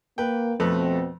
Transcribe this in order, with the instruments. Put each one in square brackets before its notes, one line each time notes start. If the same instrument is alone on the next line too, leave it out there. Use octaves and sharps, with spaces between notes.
[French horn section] A#3 [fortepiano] B4 G5
[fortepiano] F2 A3 B4 [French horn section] B2 C4